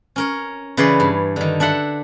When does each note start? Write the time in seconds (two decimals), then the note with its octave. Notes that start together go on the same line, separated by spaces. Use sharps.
0.16 C#4 A#4 C#5
0.77 C#3 E3 B4 C#5 D5 C6
1.00 G2
1.36 D3 D#3
1.60 D4 A4 E5 F#5 C6